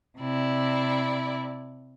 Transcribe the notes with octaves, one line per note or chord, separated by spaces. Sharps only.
C3 E4 D5